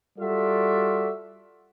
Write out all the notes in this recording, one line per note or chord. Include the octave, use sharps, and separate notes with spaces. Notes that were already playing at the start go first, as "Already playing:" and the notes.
G3 F4 F#4 A4 D5 E5